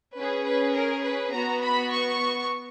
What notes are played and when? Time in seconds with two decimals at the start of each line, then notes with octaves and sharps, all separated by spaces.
0.16 C#4 G#4 B4
0.46 B4
0.75 A#4
1.04 B4
1.33 B3 F#4 A#5
1.63 B5
1.92 C#6